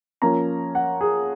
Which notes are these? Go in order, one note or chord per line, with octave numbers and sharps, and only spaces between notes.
F3 A#3 C#4 A#5
F#5
G#4